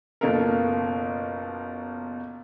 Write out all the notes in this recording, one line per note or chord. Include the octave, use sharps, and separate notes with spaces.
F#1 B2 F4 A4 A#4